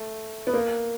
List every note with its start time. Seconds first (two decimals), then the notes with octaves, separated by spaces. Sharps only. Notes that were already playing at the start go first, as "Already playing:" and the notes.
Already playing: A3
0.47 B3
0.54 A#3